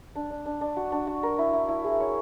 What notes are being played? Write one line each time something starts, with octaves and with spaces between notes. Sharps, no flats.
D4
D4
D4
D4
F#4
D4
F#4
A#4
E4
E4
E4
G#4
C#5